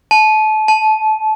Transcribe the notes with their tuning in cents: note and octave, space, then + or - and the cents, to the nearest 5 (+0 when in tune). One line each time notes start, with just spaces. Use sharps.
A5 -30
A5 -20